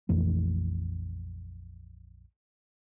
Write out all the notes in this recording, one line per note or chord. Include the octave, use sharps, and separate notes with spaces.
A#1 F2 E3 A3